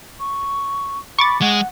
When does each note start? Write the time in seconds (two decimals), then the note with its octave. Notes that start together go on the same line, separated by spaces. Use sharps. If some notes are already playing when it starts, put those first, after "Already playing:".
0.20 C#6
1.19 B5 C#6 D6 A6
1.41 G#3 F#5